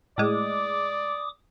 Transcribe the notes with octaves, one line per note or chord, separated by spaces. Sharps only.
A2 G#3 D5 D6 D#6